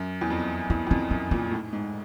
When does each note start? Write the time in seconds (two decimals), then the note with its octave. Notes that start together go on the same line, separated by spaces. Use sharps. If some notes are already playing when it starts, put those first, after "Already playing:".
Already playing: F#2
0.21 E2
0.30 F2
0.70 E2 C#4
0.87 E2
0.90 F2 C#4
1.11 F#2 C#4
1.31 A#2 D#4
1.51 A2
1.73 G#2